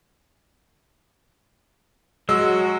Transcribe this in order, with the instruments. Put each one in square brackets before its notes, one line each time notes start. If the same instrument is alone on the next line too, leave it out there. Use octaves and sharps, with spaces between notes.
[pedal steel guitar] F#3 E6 [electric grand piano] G#3 [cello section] F#4